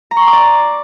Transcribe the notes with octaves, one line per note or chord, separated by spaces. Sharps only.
A#5
C#6
C6
D6
D5